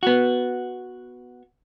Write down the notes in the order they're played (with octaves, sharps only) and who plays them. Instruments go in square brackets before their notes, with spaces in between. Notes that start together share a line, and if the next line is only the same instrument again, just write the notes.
[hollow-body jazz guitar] B3 F#4